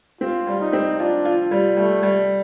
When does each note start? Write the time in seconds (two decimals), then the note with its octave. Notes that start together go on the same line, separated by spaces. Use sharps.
0.21 C4 F4
0.47 G3
0.60 D#4
0.73 C4
0.99 D4 F4
1.25 F4
1.51 G3
1.77 G3 A3
2.03 G3